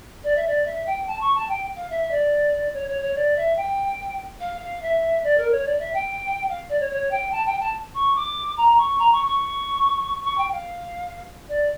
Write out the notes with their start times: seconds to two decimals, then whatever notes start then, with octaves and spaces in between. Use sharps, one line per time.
0.24 D5
0.36 E5
0.47 D5
0.65 E5
0.86 G5
1.07 A5
1.21 C#6
1.35 A5
1.48 G5
1.76 F5
1.90 E5
2.11 D5
2.73 C#5
2.88 C#5
3.01 C#5
3.15 D5
3.36 E5
3.57 G5
4.40 F5
4.61 F5
4.82 E5
5.24 D5
5.37 A#4
5.52 C#5
5.65 D5
5.79 E5
5.93 G5
6.49 F5
6.69 D5
6.80 C#5
6.90 C#5
7.11 G5
7.32 A5
7.46 G5
7.60 A5
7.94 C#6
8.15 D6
8.57 A#5
8.78 C#6
8.99 A#5
9.12 C#6
9.26 C#6
10.24 C#6
10.38 G5
10.52 F5
11.49 D5